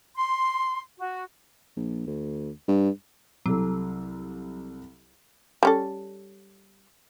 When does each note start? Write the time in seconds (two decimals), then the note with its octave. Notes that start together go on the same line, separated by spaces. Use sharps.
0.15 C6
0.99 F#4
1.76 A#1
2.07 D2
2.68 G2
3.46 C2 F#3 A4
5.63 G3 C#4 A4